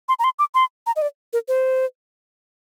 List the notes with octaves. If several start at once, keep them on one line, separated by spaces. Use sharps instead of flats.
C6
A#5
C6
D6
C6
A#5
D#5
D5
A#4
C5